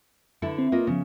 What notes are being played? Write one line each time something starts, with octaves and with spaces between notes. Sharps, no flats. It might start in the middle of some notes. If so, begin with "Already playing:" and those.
D3 E4 A4
C4
A#3 F4 D#5
C#3 F3 B3